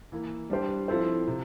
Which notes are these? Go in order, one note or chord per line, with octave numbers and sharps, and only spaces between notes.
E3 A#3 E4
G3 D4 G4 C5
F3 C4 E4 A4 C5
C3